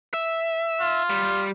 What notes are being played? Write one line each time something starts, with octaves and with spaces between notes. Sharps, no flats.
E5
F4
G3